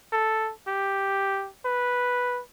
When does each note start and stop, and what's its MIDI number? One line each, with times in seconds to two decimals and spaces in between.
0.12 0.51 69
0.67 1.48 67
1.65 2.42 71